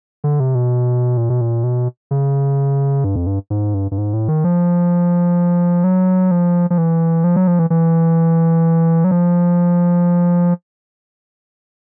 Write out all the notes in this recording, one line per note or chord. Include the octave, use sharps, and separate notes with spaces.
D3
C3
B2
A#2
B2
A#2
B2
C#3
G2
F2
G2
G#2
G2
G2
G#2
A2
D#3
F3
F#3
F3
F3
E3
F3
F#3
F3
E3
E3
F#3
F3